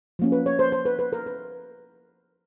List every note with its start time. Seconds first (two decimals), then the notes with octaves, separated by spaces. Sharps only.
0.19 F3 A#3 C#4
0.32 B4
0.46 C#5
0.59 C5
0.72 C5
0.85 B4
0.99 B4
1.13 A#4
1.26 B4